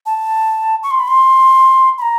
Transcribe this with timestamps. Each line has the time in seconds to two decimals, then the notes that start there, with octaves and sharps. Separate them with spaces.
0.06 A5
0.83 C#6
0.91 C6
1.00 B5
1.08 C6
1.98 B5
2.02 A#5